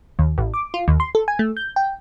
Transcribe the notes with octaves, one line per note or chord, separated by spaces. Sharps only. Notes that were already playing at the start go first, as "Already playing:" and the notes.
D#2
A1
D6
F4
D#2
C6
A4
G#5
A3
G6
G5